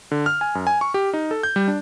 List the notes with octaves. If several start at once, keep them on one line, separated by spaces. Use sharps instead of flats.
D3
F6
G#5
F#2
G#5
C#6
G4
D#4
A4
G6
G3
D4